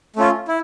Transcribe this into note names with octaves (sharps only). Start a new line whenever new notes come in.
A3 C#4 F4
E4